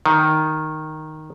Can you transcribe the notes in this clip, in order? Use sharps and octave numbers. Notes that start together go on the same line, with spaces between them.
D#3